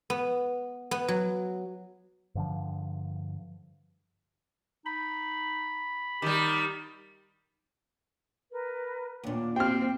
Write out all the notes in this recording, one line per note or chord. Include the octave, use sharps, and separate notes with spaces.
B3
B3
F#3
G2 D3 F3
D#4 B5
D#3 G3 G4
A#4 B4
D#2 A#2 D4 C#5 F#5
C4 G4 G5 F6